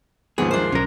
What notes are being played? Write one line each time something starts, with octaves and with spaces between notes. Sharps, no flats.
D#2 G#2 F3 B3 G#4
D4 A#4 C5
B1 C#4 A#4 A#6